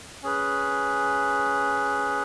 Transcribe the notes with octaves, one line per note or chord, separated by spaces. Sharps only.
C#4 G#4 B4